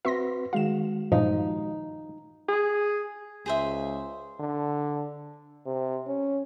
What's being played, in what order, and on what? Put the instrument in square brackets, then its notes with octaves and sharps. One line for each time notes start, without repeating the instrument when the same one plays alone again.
[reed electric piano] C4 F#4 B4 [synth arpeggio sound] E5 C6 A#6
[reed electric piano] D#3 G#3 F#4 [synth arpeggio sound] F5 E7
[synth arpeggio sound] G2 A#2 [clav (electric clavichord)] F3 [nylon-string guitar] D#4
[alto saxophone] G#4
[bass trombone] C#2 [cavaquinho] G#4 C5 E5
[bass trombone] D3
[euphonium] C3
C#4